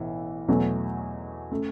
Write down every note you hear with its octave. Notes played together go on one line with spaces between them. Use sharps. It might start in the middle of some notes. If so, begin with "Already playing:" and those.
Already playing: B1 A2 E3
E2 B2 F#3 A3
C#3 A3